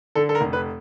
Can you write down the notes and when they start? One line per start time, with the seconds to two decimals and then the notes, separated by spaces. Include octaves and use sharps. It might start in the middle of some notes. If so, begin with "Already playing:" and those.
0.15 D3 A4
0.29 A4
0.35 A#4
0.41 F1
0.53 B4